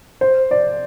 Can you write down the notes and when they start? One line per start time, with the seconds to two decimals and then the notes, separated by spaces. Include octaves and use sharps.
0.21 C5
0.51 D5